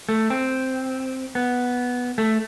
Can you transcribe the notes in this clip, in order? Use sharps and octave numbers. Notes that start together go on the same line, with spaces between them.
A3
C4
B3
A3